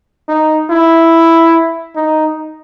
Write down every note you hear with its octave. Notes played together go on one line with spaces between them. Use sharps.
D#4
E4
D#4